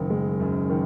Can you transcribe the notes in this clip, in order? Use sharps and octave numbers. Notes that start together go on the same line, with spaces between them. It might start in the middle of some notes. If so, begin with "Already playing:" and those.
Already playing: F#1 D#3
G#3
F#2
D#3